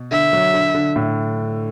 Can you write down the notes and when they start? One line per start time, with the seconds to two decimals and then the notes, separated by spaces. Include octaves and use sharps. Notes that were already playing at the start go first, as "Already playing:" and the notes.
Already playing: B2
0.11 D3 E5
0.33 F#3
0.54 D3
0.75 D3
0.96 A2